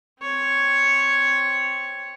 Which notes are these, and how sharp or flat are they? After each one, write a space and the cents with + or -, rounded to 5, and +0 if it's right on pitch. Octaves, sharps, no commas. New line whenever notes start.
C4 +0 C#5 +0